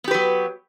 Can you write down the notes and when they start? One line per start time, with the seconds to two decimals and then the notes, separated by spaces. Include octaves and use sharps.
0.04 B3
0.08 G4
0.11 B4
0.14 F#3